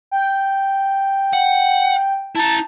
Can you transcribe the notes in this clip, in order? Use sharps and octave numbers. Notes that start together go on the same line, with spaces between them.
G5
F#5
E4 A5 A#5